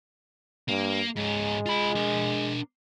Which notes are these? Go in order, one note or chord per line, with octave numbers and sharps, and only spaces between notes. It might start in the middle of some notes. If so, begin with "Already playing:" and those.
G2 A#3
G#2 G#3 C#4
F4 B5
D4 A#4